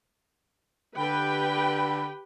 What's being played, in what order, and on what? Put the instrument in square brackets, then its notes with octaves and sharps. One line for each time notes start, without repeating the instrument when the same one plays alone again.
[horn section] D3 B5 [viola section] G4 B4 G5